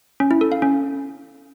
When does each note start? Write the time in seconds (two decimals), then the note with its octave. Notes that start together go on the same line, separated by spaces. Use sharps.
0.20 C#4
0.31 E4
0.41 A4
0.52 F5
0.62 C#4